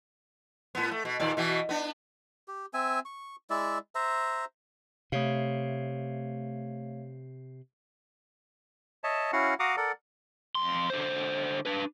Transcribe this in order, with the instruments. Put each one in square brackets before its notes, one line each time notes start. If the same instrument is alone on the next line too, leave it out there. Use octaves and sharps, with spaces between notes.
[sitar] A2 B3
A3
B2
D#2 A#2 D5
B2 E3 F#4
B3 D4
[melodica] G4
C4 E5 G#5
C#6
G#3 E4 D5 E5
C5 E5 A#5
[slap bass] C3 [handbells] A3 C#5 F5
[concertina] C#5 D#5 E5 A5
C#4 E4 F#4 F5 F#5
F#4 F5 F#5 A#5 D6 D#6
A4 A#4 D5 F#5
[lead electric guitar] F2 C6
D3 C5
D4 B4